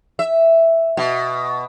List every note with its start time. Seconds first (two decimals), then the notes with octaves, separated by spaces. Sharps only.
0.19 E5
0.97 B2